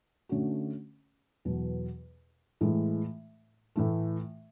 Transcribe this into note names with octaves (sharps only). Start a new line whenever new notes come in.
D3 A3 C#4 F#4
E2 B2 F#3
A2 E3 G#3
A2 E3 A3